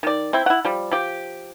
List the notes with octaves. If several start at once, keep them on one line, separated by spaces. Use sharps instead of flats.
D#3 D5
C4 E4 G5
E4 F#5
F3 G3
F3 G4